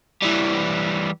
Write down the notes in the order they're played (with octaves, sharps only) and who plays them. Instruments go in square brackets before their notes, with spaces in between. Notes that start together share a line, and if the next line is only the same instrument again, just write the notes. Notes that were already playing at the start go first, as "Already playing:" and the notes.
[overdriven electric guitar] E3 G3